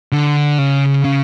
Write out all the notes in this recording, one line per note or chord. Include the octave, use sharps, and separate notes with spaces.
D3
C#3
C#3